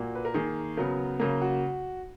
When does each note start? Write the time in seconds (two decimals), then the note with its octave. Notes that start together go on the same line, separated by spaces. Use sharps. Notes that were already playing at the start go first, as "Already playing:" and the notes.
Already playing: A#2 A#3 F#4
0.15 B4
0.25 A#4
0.34 D#3 A#3 G#4
0.77 C#3 F#3 B3 A#4
1.20 C#3 F#3 A#3 A#4
1.42 F#4